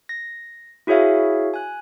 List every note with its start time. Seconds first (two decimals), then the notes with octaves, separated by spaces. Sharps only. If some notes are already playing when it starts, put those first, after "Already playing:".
0.09 A#6
0.87 E4 F#4 G#4 C#5 E5 F5
1.54 G#5 F#6